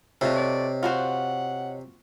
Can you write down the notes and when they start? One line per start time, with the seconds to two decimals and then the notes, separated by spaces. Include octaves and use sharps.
0.21 C3 A3 F4 F#4 C#5 D#5
0.36 D5
0.83 F4 F#4 C5 F#5